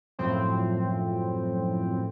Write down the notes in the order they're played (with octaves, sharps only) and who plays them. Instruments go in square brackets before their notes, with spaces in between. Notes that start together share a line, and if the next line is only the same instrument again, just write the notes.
[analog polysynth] F#2 A2 F3 C4